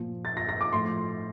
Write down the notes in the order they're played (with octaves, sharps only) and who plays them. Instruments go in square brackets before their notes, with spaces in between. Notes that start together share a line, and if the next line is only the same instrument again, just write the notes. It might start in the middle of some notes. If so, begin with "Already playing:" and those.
Already playing: [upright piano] A#2 F3
A6
A#6
A#6
D6
A2 F3 C6